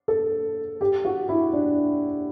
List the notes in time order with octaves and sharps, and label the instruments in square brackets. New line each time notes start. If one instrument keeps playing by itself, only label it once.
[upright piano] A4
G4
F#4
E4
D4